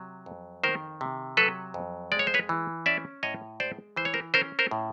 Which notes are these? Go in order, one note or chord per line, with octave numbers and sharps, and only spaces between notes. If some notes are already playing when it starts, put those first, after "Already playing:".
Already playing: C3 F#3
F2
D#3 A#4 C5
C3
F#3 A4 B4
F2
G#3 D5
C#5
C5
B4 C#5
E3
C#4 D5 E5
A2 C#5 D#5
G#3 C5 D5
E3 C5
C#5
A#4 C5
C#4 A#4 C5
A#4 C5
A2